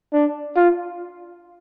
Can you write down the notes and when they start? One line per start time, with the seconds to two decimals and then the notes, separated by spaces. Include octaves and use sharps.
0.13 D4
0.56 F4